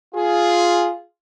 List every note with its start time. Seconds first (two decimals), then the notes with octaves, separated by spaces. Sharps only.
0.15 F4 G#4